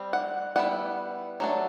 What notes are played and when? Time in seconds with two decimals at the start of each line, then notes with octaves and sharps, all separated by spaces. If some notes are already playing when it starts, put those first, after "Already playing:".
Already playing: G3 C4
0.13 F#5
0.56 G3 B3 E4 F#5
1.40 F#3 A3 D4